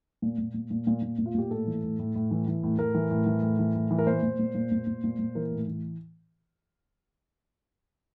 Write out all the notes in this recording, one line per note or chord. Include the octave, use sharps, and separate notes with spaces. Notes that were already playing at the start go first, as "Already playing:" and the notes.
A#2
A#2
A#2
A#2
A#2
A#2
A#2
F4
A#2 G4
A2 A4
E3
A2
A2
A2
E3
E3
A2
A2 A#4
E3
A2
E3
A2
E3
A2
E3
A#4
A#2 C5
A#2
A#2
A#2
A#2
A#2
A#2
A#2
E3 A#4
A2
E3